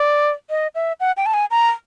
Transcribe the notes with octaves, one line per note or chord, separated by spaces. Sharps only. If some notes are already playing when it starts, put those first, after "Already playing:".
Already playing: D5
D#5
E5
F#5
G5
A5
G#5
A#5